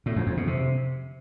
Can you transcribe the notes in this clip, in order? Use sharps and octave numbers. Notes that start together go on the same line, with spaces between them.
A2
F2
F2
B2
C3